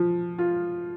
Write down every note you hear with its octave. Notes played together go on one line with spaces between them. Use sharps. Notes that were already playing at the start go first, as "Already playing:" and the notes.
Already playing: F3
F4